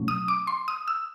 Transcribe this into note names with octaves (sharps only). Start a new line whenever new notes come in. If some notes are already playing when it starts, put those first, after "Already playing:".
Already playing: B2 F#3 A3 C#4
D#6
D6
C6
D#6
E6